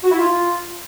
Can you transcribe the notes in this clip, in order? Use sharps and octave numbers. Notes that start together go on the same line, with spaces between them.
F#4
E4
F4